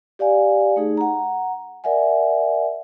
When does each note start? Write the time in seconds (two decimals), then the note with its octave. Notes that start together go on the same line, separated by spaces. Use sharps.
0.19 G4 D5 F5 G#5
0.76 A3 D#4 G#4
0.97 F#5 A#5
1.84 A#4 D5 E5 F#5 G#5